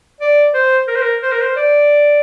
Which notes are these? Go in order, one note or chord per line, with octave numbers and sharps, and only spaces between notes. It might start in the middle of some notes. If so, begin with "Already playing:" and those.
D5
C5
A#4
C5
A#4
C5
A#4
C5
D5